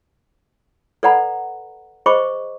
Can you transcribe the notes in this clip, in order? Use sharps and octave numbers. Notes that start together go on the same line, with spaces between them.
A4 B4 D5 F#5 A#5 B5
G#4 C5 D#5 B5 C#6 D6